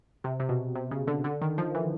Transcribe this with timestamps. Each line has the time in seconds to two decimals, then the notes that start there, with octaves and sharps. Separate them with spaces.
0.24 C3
0.40 C3
0.49 B2
0.75 C3
0.91 C#3
1.07 D3
1.24 D3
1.41 D#3
1.58 F3
1.75 E3